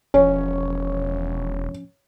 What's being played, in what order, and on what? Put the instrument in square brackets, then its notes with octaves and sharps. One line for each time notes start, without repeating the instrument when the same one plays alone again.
[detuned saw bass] E1 [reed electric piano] F3 C#4 [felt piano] C#5